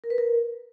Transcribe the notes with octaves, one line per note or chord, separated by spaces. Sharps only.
A#4
B4
A#4